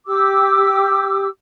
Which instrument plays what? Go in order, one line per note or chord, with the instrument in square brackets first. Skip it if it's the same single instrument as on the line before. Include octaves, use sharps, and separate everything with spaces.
[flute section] G4 D6 E6